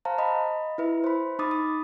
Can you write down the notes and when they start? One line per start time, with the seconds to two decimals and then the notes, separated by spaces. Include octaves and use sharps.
0.05 C5 F5 A5 A#5
0.18 D#5 B5
0.78 E4 B4 E5
1.04 C5 B5
1.39 D#4 B5 D6 D#6 A6
1.51 D#6